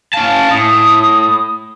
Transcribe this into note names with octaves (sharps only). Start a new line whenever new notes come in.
C#4 F5 A5
A2 D#6